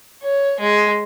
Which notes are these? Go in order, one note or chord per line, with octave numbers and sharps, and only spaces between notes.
C#5
G#3